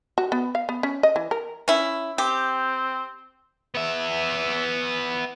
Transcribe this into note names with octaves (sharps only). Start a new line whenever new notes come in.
F#4
B3
F5
B3
C#4
D#5
E3
A#4
C#4 E4
C4 G4
B3 E5